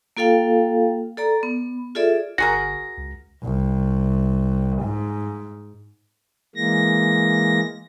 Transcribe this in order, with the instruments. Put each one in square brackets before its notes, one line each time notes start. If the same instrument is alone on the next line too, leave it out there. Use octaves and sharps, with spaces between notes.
[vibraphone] A#3 F4 A4 F5 G5
A4 D5 A#5
B3
F4 G#4 A4 D5 E5
[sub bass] G1 [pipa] F#4 G#4 A#4 [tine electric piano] A#6
[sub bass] C#2
[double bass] C2
G#2
[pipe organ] E3 G#3 A#3 A#6